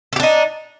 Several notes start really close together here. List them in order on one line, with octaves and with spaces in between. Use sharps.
A4 G4 D4 D#4